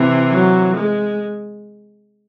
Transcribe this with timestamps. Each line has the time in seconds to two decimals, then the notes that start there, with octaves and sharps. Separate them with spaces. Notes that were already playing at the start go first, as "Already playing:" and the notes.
Already playing: C3 E3
0.29 F#3
0.76 G#3